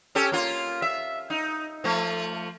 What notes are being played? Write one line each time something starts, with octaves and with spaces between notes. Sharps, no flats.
C#4 G4 A4
A#3 F4
E5
D#4
F3 A3